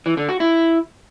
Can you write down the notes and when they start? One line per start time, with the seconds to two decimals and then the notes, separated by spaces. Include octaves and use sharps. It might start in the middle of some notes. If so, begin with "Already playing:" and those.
0.06 E3
0.17 D3
0.29 F#4
0.40 E4